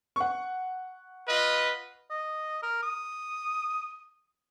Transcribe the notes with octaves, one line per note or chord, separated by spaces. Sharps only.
F#5 C#6
F4 B4 D#5
D#5
A#4
D#6